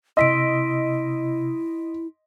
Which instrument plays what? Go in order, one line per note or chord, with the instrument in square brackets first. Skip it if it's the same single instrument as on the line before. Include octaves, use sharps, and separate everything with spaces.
[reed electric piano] C3 E6 [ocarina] E4 [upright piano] D#5 [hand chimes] C6 B6 D7